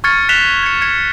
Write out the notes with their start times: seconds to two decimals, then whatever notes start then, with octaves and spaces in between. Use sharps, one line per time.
0.04 C#6 F6 G#6 A6 C#7
0.29 F#6 B6 E7 F7 G7
0.63 G#6 C#7
0.82 G#6 C#7